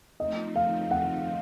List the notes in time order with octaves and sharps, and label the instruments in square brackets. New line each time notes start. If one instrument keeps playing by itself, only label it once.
[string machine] F3 A3 C4 D#4 [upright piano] D#5
[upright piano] F5
F#5